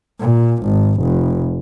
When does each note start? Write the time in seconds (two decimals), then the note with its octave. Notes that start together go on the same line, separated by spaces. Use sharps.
0.20 A#2
0.64 G#1
1.02 F1